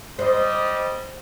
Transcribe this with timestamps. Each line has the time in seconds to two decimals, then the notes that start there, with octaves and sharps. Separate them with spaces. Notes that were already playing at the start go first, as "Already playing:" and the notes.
0.19 G3 G#3 C5 D#5